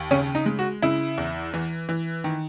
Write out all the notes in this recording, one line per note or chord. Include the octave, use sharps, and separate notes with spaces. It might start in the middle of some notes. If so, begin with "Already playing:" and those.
Already playing: D#2
C#3 C#4
D#4
G#3
F#4
C#3 E4
E2
E3
E3
D#3